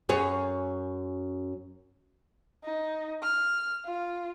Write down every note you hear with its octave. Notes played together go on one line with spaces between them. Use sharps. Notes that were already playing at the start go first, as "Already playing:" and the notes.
F#2 G#4 C#5
D#4
F6
F4